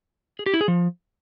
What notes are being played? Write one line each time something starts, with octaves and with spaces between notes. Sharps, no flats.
G#4
G4
E4
G#4
F3